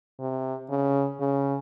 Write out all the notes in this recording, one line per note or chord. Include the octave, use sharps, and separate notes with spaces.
C3
C#3
C#3